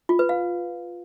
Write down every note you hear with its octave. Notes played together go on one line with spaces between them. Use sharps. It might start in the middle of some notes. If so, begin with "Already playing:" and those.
F4
B4
F5